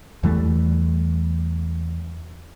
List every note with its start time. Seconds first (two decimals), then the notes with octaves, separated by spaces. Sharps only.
0.23 E2 E3 G3 A3